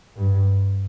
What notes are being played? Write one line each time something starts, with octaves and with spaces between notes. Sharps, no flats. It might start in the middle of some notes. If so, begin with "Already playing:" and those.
G2